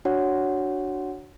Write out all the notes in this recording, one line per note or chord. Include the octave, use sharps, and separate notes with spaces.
D4 F#4 C#5 F#5